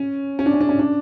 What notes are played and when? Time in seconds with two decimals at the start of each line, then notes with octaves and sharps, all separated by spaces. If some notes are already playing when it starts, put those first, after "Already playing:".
Already playing: C#4
0.39 C#4
0.46 D4
0.54 C#4
0.61 D4
0.69 C#4
0.79 D4